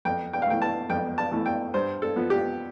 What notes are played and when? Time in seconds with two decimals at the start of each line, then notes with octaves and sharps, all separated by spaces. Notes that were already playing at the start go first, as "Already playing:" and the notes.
0.05 F2 G5
0.33 G5
0.42 F5
0.47 E3 A3 G5
0.62 A5
0.90 F2 G5
1.18 A5
1.31 E3 A3
1.46 G5
1.74 G2 C5
2.02 A4
2.16 F3 B3
2.30 G4